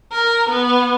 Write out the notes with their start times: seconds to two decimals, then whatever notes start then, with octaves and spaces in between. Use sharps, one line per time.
0.11 A#4
0.49 B3